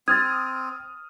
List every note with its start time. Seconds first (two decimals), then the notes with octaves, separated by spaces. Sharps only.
0.08 C4 D#6 F6 G#6 A6